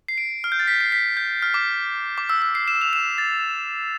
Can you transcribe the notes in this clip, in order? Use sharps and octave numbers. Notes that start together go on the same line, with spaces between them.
C7
D7
F6
G6
A6
B6
C7
B6
G6
F6
D6
D6
E6
E6
C7
E7
F7
E7
A6